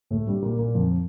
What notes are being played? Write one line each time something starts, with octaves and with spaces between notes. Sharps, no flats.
A2 A3
G2 G3
A#2 A#3
A#2 A#3
F2 F3